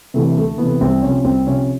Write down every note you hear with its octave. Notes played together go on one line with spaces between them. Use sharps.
C3 E3 A3
D2 A3
C3 E3 B3
C2 C4
C3 F3 C#4
C2 C4
C3 F3 C#4